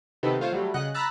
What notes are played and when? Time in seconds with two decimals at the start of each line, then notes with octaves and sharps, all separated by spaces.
0.23 C3 D#3 B3 C4 D#4 A4
0.40 A3 F4 C5 C#5
0.52 F#3 G3 A3
0.74 C#3 D#5 F#5 F#6
0.94 A#5 B5 E6 F#6 A6